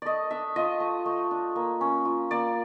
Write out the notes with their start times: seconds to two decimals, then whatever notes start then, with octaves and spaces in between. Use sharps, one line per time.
0.02 A3 D5 D#5
0.31 D4 E5
0.56 F4 D#5
0.80 A3
1.05 A3
1.31 D4
1.56 A#3
1.81 C#4
2.05 F4
2.31 A#3 D5